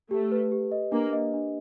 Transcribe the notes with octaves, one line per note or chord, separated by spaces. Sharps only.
A3 G4
B4
G4
D#5
A#3 D4
D#5
D4